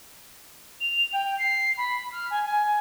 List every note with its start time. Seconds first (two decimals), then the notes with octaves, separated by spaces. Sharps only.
0.80 F7
1.13 G5
1.38 C7
1.77 B5
2.12 F6
2.30 G#5
2.45 G#5